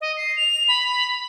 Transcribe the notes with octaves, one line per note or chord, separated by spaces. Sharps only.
D#5
C7
F7
B5